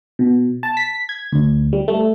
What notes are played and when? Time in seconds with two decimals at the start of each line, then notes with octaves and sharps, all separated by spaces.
0.19 B2
0.63 A5
0.77 B6
1.09 G#6
1.33 D2
1.73 G3
1.88 A3